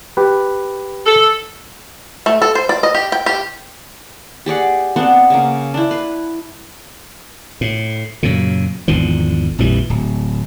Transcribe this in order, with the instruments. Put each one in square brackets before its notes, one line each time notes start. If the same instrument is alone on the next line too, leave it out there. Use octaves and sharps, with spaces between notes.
[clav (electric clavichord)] G4 B4
[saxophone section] A4
[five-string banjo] A3
A4
C5
D5
D#5
G4
G5
G4
[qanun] G4 G#4 D5 F#5
B3 C4 D4 F#5
C#3 A#3
D4 E4
B4
[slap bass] A2
F#2 A#2 C#3
G#1 E2 D3 F3
A#1 F2 E3 G3
D1